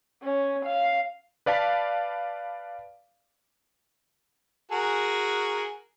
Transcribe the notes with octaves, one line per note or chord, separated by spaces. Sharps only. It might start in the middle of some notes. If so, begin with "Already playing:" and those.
C#4
F5
B4 D5 F5 A5 B6
F#4 G#4 A#4